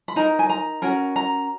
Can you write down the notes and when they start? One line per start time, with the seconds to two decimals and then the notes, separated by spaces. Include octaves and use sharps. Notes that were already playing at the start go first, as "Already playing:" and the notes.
0.08 B5
0.16 D#4 A#4 A#5
0.39 G#5
0.49 A#5
0.82 C#4 F#4 A#4
1.16 A#5